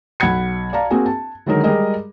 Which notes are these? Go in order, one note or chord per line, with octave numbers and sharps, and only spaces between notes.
B1 F#5 B5 G#6 C#7
D5 F5 A5 A#5
A#3 C4 F#4 G#4 G#5
A5
D3 D#3 F#3 G#3 D#4 A#4
G3 G#3 G#4 A#4 D#5